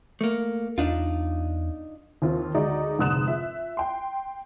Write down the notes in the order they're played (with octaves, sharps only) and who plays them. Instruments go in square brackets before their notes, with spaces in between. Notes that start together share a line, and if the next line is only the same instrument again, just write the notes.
[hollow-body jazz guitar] A3 A#3
[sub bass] E2 [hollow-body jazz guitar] D4 D#4 F4
[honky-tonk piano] D#2 C4 F4
D2 G#3 D#4 F#4 D5
F1 G#2 D3 D#6 F#6 E7
F4 E5
G5 C6